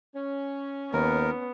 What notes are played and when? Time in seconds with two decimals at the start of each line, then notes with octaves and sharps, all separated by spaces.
0.15 C#4
0.93 D#2 B3 A#4